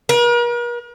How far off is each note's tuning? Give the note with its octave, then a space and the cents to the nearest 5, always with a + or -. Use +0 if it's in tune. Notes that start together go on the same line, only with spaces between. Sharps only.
A#4 +45